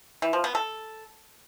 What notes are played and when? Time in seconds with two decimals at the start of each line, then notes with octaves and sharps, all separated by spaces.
0.22 E3
0.33 F3
0.44 B3
0.55 A4